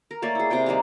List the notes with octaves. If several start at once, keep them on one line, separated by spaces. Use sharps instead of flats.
A#4
A3 A#3 C#5 D5
E4 G#4
C3 C4 G#4 G5
G3 A#3 D#4 G4